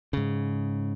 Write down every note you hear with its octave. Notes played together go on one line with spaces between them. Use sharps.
G#2 C#3